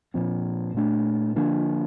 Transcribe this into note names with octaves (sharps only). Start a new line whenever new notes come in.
A#2 F3 C4
A#2 A3 D4
D3 F3 A#3 D4